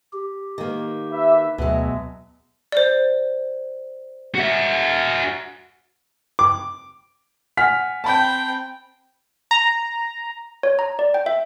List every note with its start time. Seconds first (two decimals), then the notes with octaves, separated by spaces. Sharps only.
0.13 G4
0.58 D#3 A#3
1.11 B4 E5
1.58 D2 B2 F#3 G#3 E5
2.72 C5 D5
4.35 F#4 E5
6.39 D6
7.57 F#5 G#5 F6 B6
8.04 C4 G5 A5 B5 G6
9.51 A#5
10.63 C#5
10.79 A#5
10.99 D5
11.14 G5
11.26 E5